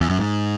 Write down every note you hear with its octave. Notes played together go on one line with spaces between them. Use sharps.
E2
F#2
G#2